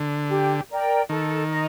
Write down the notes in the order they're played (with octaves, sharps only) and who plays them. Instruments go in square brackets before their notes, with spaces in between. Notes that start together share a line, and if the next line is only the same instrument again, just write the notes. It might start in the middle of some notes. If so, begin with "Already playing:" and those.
Already playing: [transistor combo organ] D3
[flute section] G4
A#4 D5 G5
[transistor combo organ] D#3 [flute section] A4
[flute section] D#5 A#5